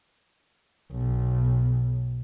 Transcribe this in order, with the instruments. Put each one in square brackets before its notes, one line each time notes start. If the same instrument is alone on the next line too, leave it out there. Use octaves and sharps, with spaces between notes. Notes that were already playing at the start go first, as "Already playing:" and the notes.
[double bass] B1